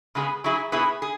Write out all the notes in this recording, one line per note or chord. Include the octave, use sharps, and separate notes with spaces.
C#3 G#3 B3 G#4
F#3 E4 G#4
B2 B3 E4 G#4
G#4